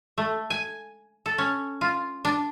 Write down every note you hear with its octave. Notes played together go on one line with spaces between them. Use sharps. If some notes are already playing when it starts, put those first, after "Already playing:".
A3
G#5
A4
C#4
F4
D4